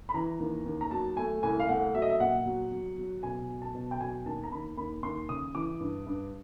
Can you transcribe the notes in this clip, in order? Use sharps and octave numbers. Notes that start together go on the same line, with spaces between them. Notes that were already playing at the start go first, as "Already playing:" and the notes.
B5
E3 A#5
D#2
D#2
A#5
F#3 A5
A3 G#5
C2 G#5
F5
A3 F#5
F#3 E5
D#5
E5
A#2 F#5
F#3
F#3
F#3
B2 G#5
F#3
A5
B2
G5
F#3 G#5
D#2 A5
A#5
D#2 B5
D#2 B5
D#2 C6
C#3 D#6
E3 D6
G2
G2